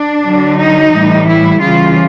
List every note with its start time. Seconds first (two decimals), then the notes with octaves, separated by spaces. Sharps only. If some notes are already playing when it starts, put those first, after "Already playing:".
Already playing: D4
0.25 D3 F#3
0.58 D#4
0.92 A2 E3 G3
1.26 E4
1.60 C#3 E3 G3 F4